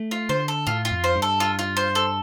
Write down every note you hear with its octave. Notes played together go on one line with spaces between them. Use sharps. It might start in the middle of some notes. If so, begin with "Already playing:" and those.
Already playing: A3
F4
D3 C5
A4
A2 F4
F4
F2
C5
G2
A4
F4
F4
C5
A4